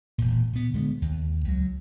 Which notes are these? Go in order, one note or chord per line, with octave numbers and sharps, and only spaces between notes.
E1 A#2
A#2 B3
D3 G#3 A3 B3
D#2
C#2 F#3